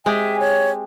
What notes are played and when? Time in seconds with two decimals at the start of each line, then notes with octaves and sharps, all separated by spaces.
0.06 G#3 C4 G4 E5 G#5
0.39 C#5